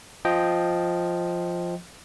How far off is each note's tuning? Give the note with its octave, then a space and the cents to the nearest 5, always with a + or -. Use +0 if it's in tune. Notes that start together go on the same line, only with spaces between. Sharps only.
F3 +0 D#5 +5 G5 +0